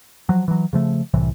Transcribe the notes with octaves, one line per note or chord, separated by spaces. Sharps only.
F3 F#3
E3 F#3
C#3 F3 A3
C2 A2 C3 E3